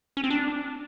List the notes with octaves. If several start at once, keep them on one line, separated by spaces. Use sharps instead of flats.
C#4
C4
D4